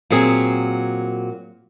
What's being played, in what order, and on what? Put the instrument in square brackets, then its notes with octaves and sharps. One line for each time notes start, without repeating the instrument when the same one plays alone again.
[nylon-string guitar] A#2 F#3 C4 G#4